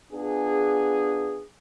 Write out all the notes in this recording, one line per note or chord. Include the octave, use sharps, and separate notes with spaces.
B3 D4 F4 G#4